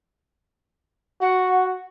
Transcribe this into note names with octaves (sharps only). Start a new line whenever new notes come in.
F#4 F#5